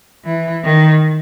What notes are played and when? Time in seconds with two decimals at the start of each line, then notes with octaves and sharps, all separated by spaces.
0.25 E3
0.64 D#3